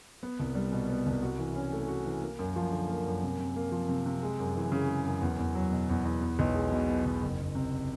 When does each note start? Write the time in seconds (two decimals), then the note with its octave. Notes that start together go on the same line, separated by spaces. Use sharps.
0.23 B3
0.39 C2
0.55 G3
0.72 B2
0.89 B3
1.06 C2
1.23 F#4
1.39 E3
1.55 C#4
1.73 A3
1.88 F#4
2.06 E3
2.22 A#3
2.39 F#2
2.56 F3
2.72 D3
2.89 A#3
3.06 F#2
3.23 C3
3.39 C3
3.56 A#3
3.72 F3
3.89 C3
4.06 C3
4.23 G#3
4.39 F#2
4.56 E3
4.72 C#3
4.89 G#3
5.05 F#2
5.21 E2
5.39 E2
5.55 F#3
5.71 B2
5.89 E2
6.05 E2
6.21 B3
6.39 B1
6.55 G#3
6.72 B2
6.89 B3
7.05 B1
7.22 F#1
7.39 F#1
7.55 C3